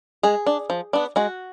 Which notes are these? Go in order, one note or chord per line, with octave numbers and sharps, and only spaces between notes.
G#3 G#4
D4
F3
B3 D4
G#3 F#4